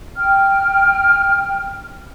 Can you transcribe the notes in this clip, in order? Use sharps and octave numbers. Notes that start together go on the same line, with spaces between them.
G5 F6